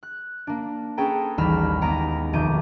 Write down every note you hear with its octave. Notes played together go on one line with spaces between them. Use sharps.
F#6
A#3 D4
C#4 G#4 A4 B4 G5 A#5
A1 D#2 G3 B5 F6 E7
D#2 G#3 B3 A#5 D7
F1 B1 D#3 D6 G6 D#7